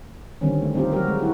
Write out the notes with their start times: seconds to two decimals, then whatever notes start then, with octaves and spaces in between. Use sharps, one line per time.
0.41 D3 D#3 G3 C4 C#4
0.62 A3
0.74 G3 C4 D#4 F4 G4
0.92 F#3 F#4 G4 A#4
1.08 G3 G#3
1.19 E4 F#4